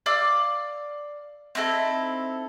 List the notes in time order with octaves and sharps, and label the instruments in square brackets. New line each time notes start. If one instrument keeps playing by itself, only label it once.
[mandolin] D5 F5 D6 E6
C4 D#4 E4 A4